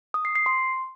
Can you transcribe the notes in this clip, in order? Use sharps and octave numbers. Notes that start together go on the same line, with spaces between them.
D#6
C7
C7
C6